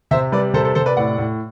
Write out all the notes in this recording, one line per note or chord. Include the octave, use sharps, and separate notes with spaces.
C3 C5 E5
G3 B4 D5
C3 A4 C5
A4 C5
C3 A4 C5
B4 D5
A2 D5 F#5
A2